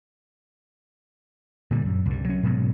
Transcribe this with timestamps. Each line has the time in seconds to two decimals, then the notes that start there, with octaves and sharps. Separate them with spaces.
1.71 A#2 D3 G3
1.86 F#2
2.06 C2 G2
2.25 F#3 C#4
2.43 G#2 B2 F#3